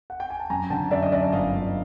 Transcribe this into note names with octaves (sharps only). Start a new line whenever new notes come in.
F#5
G5
G#5
A5
F#2 G#5 A#5
D3 G5 A5
F#2 D5 E5
D#5
F#2 D5 E5
G1 D#5 F5
G1